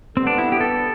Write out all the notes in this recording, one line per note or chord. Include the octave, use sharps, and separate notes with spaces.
D3 G3 B3 C4
D4
E4
G4
A4